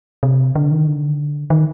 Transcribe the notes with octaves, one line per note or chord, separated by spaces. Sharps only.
C3
D3
D#3
D3
D#3